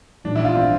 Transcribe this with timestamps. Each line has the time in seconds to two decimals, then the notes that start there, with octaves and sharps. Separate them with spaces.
0.24 A#1 G#2 E3 G3 D4
0.35 E4
0.45 F4
0.55 C4